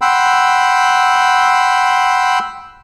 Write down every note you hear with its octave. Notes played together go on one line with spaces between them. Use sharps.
F#5 G5 B5 C6 E6